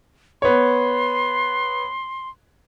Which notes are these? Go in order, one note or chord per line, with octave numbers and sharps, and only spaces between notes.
B3 C#5 C6